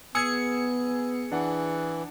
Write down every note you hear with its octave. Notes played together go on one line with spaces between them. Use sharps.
B3 G#4 E6 G#6 C#7
E3 D4 F#5